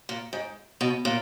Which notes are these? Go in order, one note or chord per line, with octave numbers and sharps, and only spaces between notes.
A#2
G#2
B2
A#2